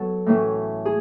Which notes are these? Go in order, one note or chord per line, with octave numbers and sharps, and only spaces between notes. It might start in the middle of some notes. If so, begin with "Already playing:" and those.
Already playing: F#3 B3 F#4 A4
A2 E3 A3 C#4
G#4